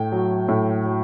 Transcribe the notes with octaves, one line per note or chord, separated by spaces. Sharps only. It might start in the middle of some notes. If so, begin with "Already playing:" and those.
Already playing: A2 G5
F#3
A2
F#3